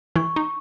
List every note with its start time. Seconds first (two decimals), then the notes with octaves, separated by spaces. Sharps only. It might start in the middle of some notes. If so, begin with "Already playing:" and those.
0.16 E3 E4 C#6
0.36 D#4